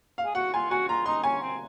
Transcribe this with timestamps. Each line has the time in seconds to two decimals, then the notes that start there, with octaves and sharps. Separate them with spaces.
0.18 F5
0.26 G#4
0.35 F#4 F#5
0.54 F4 G#5
0.70 F#4 G#5
0.88 F4 A#5
1.06 D#4 C6
1.24 C#4 G#5
1.42 C4